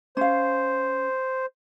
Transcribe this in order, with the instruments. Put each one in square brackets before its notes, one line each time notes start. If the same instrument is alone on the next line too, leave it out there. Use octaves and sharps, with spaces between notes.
[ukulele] C#4 F5 [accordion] C5